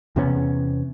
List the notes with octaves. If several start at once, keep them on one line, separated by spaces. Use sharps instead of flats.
E2 C3 B3 C#4